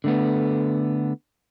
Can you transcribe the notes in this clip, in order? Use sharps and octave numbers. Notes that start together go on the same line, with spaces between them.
D3 A3 B3